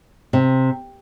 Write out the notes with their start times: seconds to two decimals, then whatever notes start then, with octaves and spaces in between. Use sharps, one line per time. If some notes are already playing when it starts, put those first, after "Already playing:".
0.33 C3